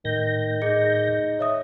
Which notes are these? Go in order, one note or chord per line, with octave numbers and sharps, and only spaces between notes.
A2 D#3 G6 A#6
D#4 G#4 D#5 C#7
C#5 E5 D#6